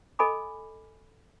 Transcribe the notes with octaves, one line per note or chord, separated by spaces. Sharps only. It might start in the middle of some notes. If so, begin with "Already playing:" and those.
A4 D#5 G#5 B5 D6